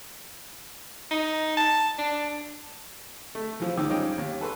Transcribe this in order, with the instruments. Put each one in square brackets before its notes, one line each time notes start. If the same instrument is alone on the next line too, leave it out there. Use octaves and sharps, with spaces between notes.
[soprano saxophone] D#4
A5
D4
[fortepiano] A3
E3 F3
C#2 D#3 G#3 D6 E6
G2 F3 C#4 D#4 D#5 G5
D#2
A4 B4 C6 C#6